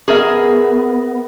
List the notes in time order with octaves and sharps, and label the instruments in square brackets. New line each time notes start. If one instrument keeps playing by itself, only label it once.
[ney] B3 [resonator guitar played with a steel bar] G#4 A#4 E5